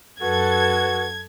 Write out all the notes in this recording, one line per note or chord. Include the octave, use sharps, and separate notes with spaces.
F#2 F#4 A4 B4 G#6